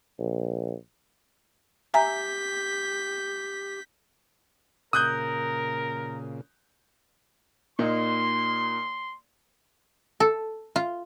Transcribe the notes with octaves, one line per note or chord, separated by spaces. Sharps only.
A#1
G4 E5 G#5 A#5 G6 B6
A#2 C#3 A#4 D#6 F#6 G6
A#2 A#3 D#4 C6
A4
F4